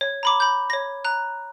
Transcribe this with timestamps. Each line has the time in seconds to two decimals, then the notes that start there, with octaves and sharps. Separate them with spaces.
0.01 C#5
0.23 A#5 B5 D6
0.40 B5 G6
0.70 C#5 A#6
1.05 A#5 F#6